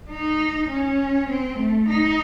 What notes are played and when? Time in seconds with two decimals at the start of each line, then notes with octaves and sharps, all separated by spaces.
0.10 D#4
0.69 C#4
1.30 C4
1.59 A3
1.89 D#4